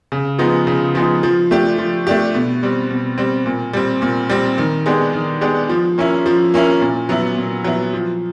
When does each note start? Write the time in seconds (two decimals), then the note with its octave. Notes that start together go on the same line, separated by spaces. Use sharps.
0.12 C#3
0.39 F3 G#3 B3 D#4
0.67 C#3
0.95 F3 G#3 B3 D#4
1.23 F3
1.51 A3 D4 G4
1.78 F3
2.07 A3 D4 G4
2.34 B2
2.63 G3 C4
2.90 B2
3.18 G3 C4
3.46 A#2
3.73 G3 C4
4.02 A#2
4.30 G3 C4
4.58 D#3
4.86 G#3 B3 D4 G4
5.13 D#3
5.41 G#3 B3 D4 G4
5.69 F3
5.98 A#3 C#4 E4
6.26 F3
6.54 A#3 C#4 E4
6.81 A#2
7.09 F#3 B3 E4
7.37 A#2
7.64 F#3 B3 E4
7.93 F3